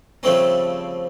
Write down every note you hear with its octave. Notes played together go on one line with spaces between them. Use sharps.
C#3 F3 G3 A3 C4 C#4